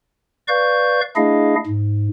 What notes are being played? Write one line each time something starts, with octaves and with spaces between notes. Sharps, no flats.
B4 D5 F5 C#6 G6
A3 D4 E4 G#4 D#5 F5
G#2